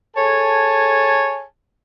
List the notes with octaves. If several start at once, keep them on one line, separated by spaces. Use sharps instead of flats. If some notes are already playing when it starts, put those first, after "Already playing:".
G#4 A4 C#5 G#5 A5